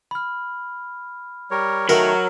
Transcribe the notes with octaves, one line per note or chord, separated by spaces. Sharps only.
B5 F6
G3 A#4 C#5
D#3 F#3 A3 A#4 A#5 E6 F6